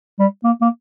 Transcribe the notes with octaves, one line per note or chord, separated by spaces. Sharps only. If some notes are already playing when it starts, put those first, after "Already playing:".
G3
A#3
A#3